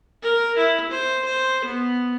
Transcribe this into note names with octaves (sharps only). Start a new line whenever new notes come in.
A#4
E4
C5
C5
B3